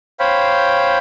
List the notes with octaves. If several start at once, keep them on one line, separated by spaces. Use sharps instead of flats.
C5 C#5 F5 G5 B5